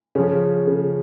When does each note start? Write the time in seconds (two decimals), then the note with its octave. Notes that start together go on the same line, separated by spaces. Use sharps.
0.15 C#3 F3 C#4
0.67 C#3 C#4